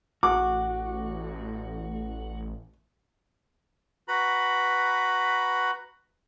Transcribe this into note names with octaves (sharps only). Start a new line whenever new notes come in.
A1 F#4 D6
F#4 B4 A#5 B5